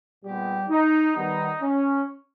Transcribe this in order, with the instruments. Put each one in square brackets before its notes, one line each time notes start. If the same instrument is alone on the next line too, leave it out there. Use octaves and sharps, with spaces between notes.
[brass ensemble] A#2 G3 G#3 B3 G4
D#4
D#3 G3 B3 D#4
C#4